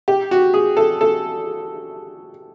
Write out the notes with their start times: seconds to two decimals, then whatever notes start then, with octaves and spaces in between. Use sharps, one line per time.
0.08 G4
0.31 F#4
0.54 G#4
0.77 A4
1.01 A4